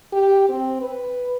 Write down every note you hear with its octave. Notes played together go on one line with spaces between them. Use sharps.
G4
C4
B4